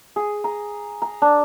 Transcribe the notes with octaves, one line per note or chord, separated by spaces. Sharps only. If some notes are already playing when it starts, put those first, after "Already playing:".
G#4
A#5
A#5
D4